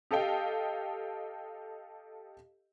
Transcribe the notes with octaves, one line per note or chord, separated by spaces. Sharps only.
G4 A4 D#5 F5 G5